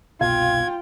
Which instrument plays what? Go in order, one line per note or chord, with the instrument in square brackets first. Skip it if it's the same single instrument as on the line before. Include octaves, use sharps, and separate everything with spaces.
[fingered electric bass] G1 C2 B2 [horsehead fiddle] F4 G5 [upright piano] F5 [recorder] G#6